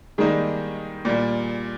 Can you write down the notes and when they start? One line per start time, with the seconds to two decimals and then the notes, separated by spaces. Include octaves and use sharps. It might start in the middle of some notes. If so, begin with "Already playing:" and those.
0.18 D#3 G3 G#3 A#3 D#4
1.05 A#2 G3 A#3